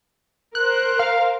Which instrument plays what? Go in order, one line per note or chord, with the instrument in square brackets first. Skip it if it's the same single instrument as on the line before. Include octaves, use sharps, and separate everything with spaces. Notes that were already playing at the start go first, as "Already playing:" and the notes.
[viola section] A#4 C5 [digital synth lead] F#6
[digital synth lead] F5